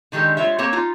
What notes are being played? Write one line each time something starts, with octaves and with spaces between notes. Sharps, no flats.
D3 D#3 G#3 G4 A4
G#3 F4 C#5 E5
A#3 C4 G4 C#5 A5
D#4 F4